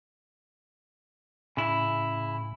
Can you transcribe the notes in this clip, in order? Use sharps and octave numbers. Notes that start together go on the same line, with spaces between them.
A2 C#3 E4